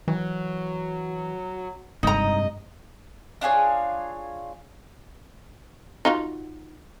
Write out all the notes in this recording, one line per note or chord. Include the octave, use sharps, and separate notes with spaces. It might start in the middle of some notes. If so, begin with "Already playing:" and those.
E3 F#3
F#1 G2 C3 G#3 D#4 D#5 A#5
D4 F4 G#4 C#5
D#4 F4 F#4